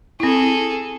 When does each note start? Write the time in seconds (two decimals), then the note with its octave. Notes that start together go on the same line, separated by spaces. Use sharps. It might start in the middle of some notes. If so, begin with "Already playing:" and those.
0.20 C4 E4 G#4 A4